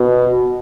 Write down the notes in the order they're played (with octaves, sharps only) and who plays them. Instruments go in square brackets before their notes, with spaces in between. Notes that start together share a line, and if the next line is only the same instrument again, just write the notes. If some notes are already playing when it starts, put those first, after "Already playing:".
Already playing: [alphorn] B2